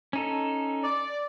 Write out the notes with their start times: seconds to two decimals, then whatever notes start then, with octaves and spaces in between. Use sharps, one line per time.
0.13 C#4 D#4 A4
0.82 D5